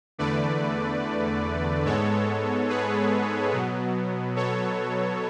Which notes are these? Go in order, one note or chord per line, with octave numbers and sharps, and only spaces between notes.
E2 D3 A3 B4 D5
G#2 G#3 B3 A4 C#5
G#4 B4
B2 F#3 B3
A4 C#5